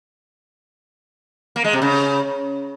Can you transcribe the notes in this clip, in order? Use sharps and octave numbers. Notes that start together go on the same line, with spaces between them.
A#3
G#3
C3
C#3